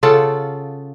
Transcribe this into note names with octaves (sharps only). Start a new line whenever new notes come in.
C#3 F4 A4 F#5